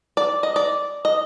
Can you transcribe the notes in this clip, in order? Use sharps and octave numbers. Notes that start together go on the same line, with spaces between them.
D5
D#5
D5
D#5